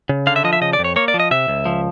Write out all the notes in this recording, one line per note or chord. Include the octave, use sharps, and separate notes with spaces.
C#3
D3 F5
E5
F3 D#5
E5
C#3 D#5
D5
F2
C#5
A#3 C#5
D5
F3
D#5
C3 E5
C#2
F3